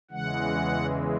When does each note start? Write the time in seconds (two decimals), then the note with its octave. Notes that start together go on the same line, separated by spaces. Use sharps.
0.11 E2 C#3 E3 G#3 F#5